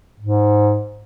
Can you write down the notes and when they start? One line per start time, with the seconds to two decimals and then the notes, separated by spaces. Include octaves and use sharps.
0.20 G#2